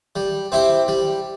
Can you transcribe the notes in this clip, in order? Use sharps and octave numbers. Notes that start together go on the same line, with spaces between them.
G3
C4 E4 G4
G3